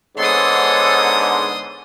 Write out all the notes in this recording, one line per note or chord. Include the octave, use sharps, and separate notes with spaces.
G#2 D3 G#3 B3 A4 C#5 C6 D#6